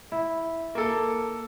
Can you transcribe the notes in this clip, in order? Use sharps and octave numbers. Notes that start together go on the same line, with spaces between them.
E4
A#3 A4